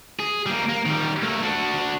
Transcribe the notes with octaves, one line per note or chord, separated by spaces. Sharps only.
G#4
G3 A#3
A#3
D#3 G3
A3 A#3
D4 F#4